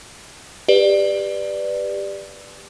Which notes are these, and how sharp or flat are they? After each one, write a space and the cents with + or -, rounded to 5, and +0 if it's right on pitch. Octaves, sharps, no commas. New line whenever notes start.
G4 +20 B4 +0 D5 +10